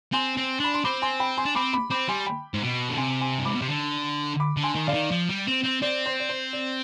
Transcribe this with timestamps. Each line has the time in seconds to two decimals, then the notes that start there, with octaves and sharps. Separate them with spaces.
0.13 C4 G#5 C6
0.37 C4
0.60 D4 B5
0.74 C6
0.84 C4 B5 D6
1.02 G#5 C6
1.20 G5 B5
1.38 G#5 C6
1.45 D4
1.55 C4 B5 D6
1.73 B5 D6
1.90 C4 B5 D6
2.08 G3 G#5 C6
2.26 G5 B5
2.54 G#2
2.62 B2
2.89 D3
2.97 C3 G#5 C6
3.21 G#5 C6
3.39 G2
3.45 G#2 B5 D6
3.54 B2
3.62 C3
3.68 D3
4.40 B5 D6
4.57 D3
4.63 G#5 C6
4.75 D#3
4.87 D3 D5 F5
4.94 D#3
5.11 F3
5.29 G3
5.47 C4
5.64 C4
5.82 C4 D5
6.06 C5
6.20 D5
6.29 C5
6.53 D5